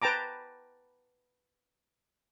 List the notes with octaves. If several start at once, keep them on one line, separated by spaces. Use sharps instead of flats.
B4 G5 A5 A#5 D6